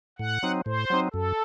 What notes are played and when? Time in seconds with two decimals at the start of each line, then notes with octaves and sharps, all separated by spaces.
0.19 A2 F#5
0.43 F#3 C4 D#4
0.66 A2 C5
0.90 F#3 C4 D#4
1.13 F#2 A4